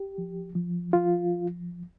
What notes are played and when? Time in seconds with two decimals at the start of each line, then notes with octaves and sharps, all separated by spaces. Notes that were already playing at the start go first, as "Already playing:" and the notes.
Already playing: G4
0.18 F3
0.55 F3
0.93 F3 F4